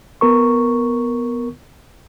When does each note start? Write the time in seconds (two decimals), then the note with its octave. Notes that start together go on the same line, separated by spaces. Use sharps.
0.21 B3 A#4 C#6